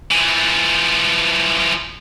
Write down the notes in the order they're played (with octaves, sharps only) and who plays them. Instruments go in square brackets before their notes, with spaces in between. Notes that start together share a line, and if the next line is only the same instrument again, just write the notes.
[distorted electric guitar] E3 F3